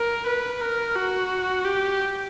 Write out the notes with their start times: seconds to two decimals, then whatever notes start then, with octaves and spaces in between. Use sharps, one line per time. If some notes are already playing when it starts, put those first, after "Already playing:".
Already playing: A#4
0.27 B4
0.61 A#4
0.96 F#4
1.65 G4